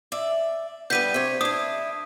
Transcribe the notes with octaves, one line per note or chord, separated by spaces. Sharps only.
D5 E5
D3 G3 B3 G6 B6 D#7
C3 C#5
D4 E4 D#6